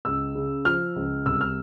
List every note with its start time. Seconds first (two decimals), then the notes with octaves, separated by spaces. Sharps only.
0.05 C#2 E6
0.35 C#3
0.65 F3 F6
0.96 C#2
1.26 C2 E6
1.41 F6